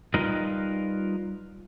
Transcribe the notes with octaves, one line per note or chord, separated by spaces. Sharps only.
G3 D#4 F4 A#4 B4 D#5